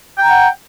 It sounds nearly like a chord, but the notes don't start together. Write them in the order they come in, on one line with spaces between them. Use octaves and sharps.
G5 A#5 F#5